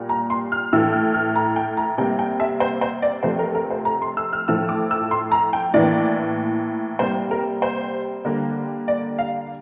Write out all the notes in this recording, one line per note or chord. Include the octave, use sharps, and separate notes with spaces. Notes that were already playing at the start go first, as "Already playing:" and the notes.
Already playing: A#2 G3 A#3
A#5
C6
F6
A2 E3 A3 E6
F6
F6
A#5
G5
A#5
C3 G3 A#3 G5
G5
E5
C5
C5
D5
C3 F3 A3 C5
A#4
A#4
C5
A#5
C6
E6
F6
A2 F3 A3 E6
D6
E6
C6
A#5
G5
A2 E3 A#3 D5
C3 G3 A#3 C5
A#4
C5
D3 G3 A#3
D5
F5